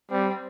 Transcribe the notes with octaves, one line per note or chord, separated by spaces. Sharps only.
G3 C4